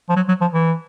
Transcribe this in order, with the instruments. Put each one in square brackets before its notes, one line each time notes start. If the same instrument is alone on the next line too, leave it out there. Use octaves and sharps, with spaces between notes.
[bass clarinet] F3
F#3
F#3
F3
E3